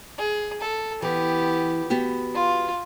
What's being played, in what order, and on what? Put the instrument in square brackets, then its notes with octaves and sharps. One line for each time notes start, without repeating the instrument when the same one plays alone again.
[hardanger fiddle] G#4
A4
[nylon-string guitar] E3 [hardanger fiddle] B3 G4
[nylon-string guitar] B3 F#4 G4
[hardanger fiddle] F4